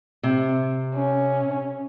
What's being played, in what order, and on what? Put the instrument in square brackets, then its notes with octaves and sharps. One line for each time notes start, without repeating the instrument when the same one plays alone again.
[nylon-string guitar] C3
[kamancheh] C#4